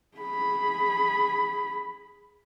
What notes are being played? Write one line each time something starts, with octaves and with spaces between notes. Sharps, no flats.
G#4 B5